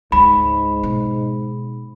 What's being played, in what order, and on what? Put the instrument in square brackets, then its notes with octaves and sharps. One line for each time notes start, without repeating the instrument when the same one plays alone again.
[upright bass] C#2 [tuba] G#2 [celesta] B5
[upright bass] B2